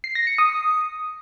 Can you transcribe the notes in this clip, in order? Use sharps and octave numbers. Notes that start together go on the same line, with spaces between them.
C7
A#6
C#7
D#6